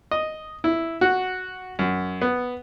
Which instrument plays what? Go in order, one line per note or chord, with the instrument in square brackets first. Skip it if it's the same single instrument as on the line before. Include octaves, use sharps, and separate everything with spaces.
[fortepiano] D#5
E4
F#4
F#2
B3